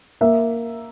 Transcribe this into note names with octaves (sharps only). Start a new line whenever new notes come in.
A#3 E5